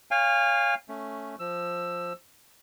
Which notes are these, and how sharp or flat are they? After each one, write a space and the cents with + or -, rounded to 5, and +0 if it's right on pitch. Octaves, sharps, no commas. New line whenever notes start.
C#5 +0 F5 +0 G#5 -35
A3 +0 C#4 +0
F3 +5 E6 +15